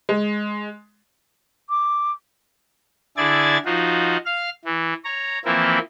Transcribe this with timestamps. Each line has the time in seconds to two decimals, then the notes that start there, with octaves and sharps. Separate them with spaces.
0.09 G#3
1.70 D6
3.17 D3 E4 G#4 D5 G#6 A6
3.65 F3 D#4 F4 F#4
4.26 F5 F6
4.65 E3
5.05 C#5 A#5
5.45 E3 F3 A#3 C4 E4